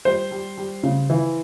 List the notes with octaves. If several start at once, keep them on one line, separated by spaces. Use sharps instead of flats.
G3 C5
G3
G3
C#3
E3